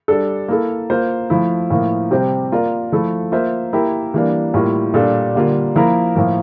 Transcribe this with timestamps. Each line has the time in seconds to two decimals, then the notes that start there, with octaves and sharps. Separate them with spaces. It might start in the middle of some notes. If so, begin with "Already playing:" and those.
0.08 G3 D4 A4
0.48 A#3 E4 A4
0.90 A#3 F4 C5
1.30 F3 A3 E4
1.70 A2 F3 A#3
2.11 C3 G3 C4 G4 C5
2.52 A#3 F4 A#4 D5
2.92 F3 A3 E4 A4
3.32 A#3 F4 C5 E5
3.73 A#3 E4 G4 A#4 E5
4.14 E3 G3 A#3 D4
4.54 A2 G3 A#3 F4
4.94 A#2 G3 D4 A4
5.35 D3 G3 A#3 D4 F4
5.76 F3 A#3 E4 A#4
6.15 A2 F3 A#3